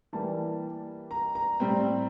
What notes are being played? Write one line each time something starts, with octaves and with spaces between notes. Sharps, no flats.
E3 G3 A#3 A5
A#5
A#5
A2 G3 C4